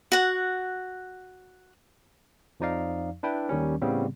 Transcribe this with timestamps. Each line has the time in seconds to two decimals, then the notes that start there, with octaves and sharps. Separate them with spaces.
0.12 F#4 F#5
2.60 F2 F3 D#4 D5 F5
3.23 D4 E4 B4 G5
3.49 D#2 D#3 G3 C#4
3.82 A2 C#3 G3 B3 C4